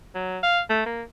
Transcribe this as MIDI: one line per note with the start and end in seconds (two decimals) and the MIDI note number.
0.15 0.38 54
0.44 0.60 77
0.70 0.85 57
0.86 1.03 58